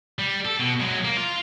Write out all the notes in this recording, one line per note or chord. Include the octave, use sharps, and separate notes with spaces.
G3
A4
B2
F#3 G#3
A#3
F4